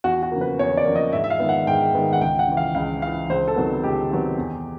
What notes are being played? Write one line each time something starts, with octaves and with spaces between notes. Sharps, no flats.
E2 F#4
F#4
C#3 F3 A#3
B4
E2 C#5
D5
C#3 F3 A#3
D#5
G#2 E5
E5
F5
D#3 G#3 B3
F#5
G#2 G5
D#3 G#3 B3
F#5
C#2 G5
F#5
C#3 E3
F5
C#2 F5
C#3 E3 F5
C#2 C5
A4
C3 D#3 F#3 B3
C#2 G4
C3 D#3 F#3 B3
E2